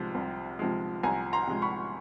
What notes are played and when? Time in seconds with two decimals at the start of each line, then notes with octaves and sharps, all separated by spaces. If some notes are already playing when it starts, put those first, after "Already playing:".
Already playing: C2 C3 F3 G#3
0.15 C2
0.59 C3 F3 G#3
1.03 C2 G#5 A#5
1.33 A#5 C6
1.47 C3 F3 G#3
1.62 B5 C#6